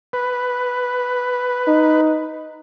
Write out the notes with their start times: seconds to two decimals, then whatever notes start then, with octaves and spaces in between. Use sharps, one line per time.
0.13 B4
1.68 D#4